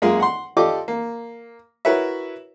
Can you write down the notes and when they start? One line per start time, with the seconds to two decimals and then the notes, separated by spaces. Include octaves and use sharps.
0.02 F#2 G#3 A#3 F4 G#4 A#4
0.20 F#5 C6
0.57 F4 G4 A4 D5 D#5 D6
0.88 A#3
1.85 E4 F#4 A#4 B4 C#5 E5